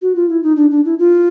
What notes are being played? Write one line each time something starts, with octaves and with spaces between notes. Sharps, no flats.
F#4
F4
E4
D#4
D4
D4
E4
F4